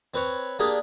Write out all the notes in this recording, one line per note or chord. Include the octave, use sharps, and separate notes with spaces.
C4 B4 C#5
A#3 D4 G4 G#4